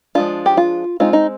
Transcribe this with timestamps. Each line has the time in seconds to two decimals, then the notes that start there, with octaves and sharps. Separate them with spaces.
0.15 F3 G#3 D4 F4
0.46 G4
0.57 F4
1.00 G#3 C4 D#4 F4
1.13 D#4